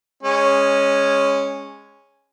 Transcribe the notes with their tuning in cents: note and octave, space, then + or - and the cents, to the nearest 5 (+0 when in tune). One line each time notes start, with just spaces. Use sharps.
G#3 -15 C#4 -5